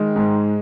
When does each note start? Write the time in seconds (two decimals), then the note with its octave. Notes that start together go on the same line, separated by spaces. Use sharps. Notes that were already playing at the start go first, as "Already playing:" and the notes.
Already playing: D#3 G#3
0.16 G#2